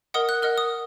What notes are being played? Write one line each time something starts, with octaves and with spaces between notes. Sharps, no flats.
A#4 D#5 F#5 D#6
F#6
A#4 D#5 F#5 F6
D#6